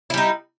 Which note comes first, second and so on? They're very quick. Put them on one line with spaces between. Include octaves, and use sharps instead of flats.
E4 G3 D#4